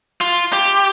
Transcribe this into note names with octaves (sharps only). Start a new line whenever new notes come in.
F4
G4